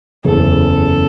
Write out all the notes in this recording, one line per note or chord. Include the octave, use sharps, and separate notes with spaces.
F#1 E2 C#3 A4